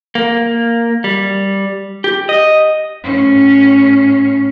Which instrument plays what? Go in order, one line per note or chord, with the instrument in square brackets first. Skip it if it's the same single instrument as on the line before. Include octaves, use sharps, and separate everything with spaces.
[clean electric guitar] A#3
G3
G4
D#5
[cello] A2 C#4